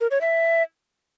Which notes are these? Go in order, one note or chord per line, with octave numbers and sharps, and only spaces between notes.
A#4
C#5
E5